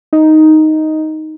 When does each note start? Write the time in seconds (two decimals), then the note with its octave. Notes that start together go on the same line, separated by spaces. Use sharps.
0.13 D#4